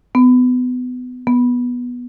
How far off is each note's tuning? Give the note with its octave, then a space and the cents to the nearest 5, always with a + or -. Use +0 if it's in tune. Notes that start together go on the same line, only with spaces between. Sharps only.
B3 +25
B3 -10